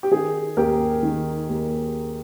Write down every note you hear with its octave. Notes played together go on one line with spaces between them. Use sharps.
G4
D#3 G#4
D#2 G4 A#4
D#3
D#2